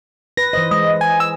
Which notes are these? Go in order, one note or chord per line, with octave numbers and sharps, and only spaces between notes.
B4 A#6
E3 C5 D#5
G#3 D#5
G#5
E6